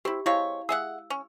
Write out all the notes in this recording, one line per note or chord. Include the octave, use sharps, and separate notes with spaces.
C4 E4 G4
G#3 C4 E4 C#5 F5
G#4 E5 F#5 E6
C#4